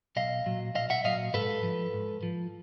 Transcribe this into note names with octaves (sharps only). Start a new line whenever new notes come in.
B1 D#5 F5
A#2 F#3
B1 D#5 F5
E5 F#5
A#2 F#3 D#5 F5
G#2 A4 B4
F3
G#2
F3